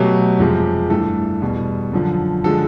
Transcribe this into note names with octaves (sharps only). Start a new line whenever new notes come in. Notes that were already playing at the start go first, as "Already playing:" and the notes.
Already playing: B2 F#3 A3 G4
F2 C3 F3 G#3
G2 E3 A3 A4
E2 B2 G3
F#2 D3 F3
D3 F3 G#3 A4